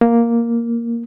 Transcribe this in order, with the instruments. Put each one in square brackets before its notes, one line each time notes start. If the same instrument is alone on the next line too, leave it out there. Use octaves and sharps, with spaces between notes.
[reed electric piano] A#3